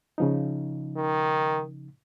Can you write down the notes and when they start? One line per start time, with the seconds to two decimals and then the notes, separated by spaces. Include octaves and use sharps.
0.18 C#3 F3 D#4
0.96 D#3